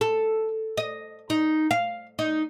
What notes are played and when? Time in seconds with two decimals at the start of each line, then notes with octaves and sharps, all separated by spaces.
0.01 A4
0.77 D#5
1.30 D#4
1.71 F5
2.19 D#4